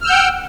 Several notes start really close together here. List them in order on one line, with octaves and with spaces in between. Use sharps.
F6 E6 G6 F#5 G5